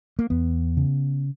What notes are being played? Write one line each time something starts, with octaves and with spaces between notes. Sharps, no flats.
A#3
E2 B3
C#3